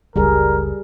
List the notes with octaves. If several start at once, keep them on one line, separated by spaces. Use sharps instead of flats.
F#1 C#2 G3 G#4 A#4